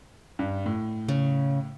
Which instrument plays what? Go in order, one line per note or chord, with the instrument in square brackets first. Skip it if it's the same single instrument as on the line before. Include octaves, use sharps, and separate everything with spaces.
[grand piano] G2
A2
[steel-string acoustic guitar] C#3